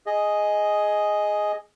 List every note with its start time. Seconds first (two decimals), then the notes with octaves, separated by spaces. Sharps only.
0.06 G#4 D#5